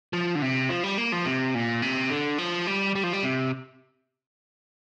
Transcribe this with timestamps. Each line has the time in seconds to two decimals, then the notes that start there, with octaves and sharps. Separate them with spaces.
0.13 F3
0.35 D3
0.42 C3
0.69 F3
0.84 G3
0.98 A#3
1.12 F3
1.26 C3
1.55 A#2
1.82 C3
2.10 D3
2.38 F3
2.67 G3
2.95 G3
3.03 F3
3.13 G3
3.23 C3